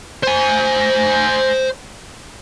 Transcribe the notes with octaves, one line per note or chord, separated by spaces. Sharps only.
C5 G#5